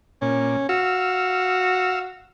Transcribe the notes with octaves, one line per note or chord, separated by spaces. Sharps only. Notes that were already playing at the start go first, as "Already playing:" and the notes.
A#2 C#4
F#4 F5 E6